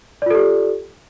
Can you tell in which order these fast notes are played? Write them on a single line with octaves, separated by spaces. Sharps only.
D5 F4 A4 G4